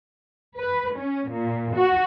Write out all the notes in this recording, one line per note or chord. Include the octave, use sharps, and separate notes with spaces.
B4
C#4
A#2
F#4